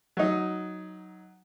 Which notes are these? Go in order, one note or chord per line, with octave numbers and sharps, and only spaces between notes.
F#3 D#4